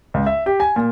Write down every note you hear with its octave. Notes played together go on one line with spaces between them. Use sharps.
C#2
E5
G4
G#5
A#2